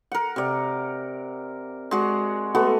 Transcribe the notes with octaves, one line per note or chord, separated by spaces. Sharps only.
A#4 F#5
C3 D5
G#3 F#4 D5
A3 B3 F#4 A4